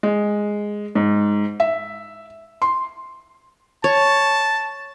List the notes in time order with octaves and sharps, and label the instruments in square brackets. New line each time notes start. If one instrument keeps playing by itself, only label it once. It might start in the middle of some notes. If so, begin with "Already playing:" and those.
[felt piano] G#3
G#2
E5
C6
[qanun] C#5 [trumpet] A5